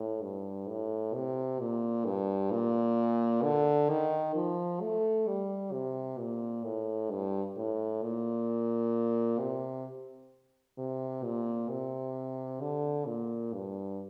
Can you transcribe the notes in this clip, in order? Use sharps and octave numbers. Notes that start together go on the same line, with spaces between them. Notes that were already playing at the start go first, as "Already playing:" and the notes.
Already playing: A2
G2
A2
C3
A#2
G2
A#2
D3
D#3
F3
A3
G3
C3
A#2
A2
G2
A2
A#2
C3
C3
A#2
C3
D3
A#2
G2